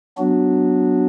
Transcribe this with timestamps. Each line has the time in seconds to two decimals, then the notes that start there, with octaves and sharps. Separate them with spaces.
0.18 F#3 B3 D4 F#4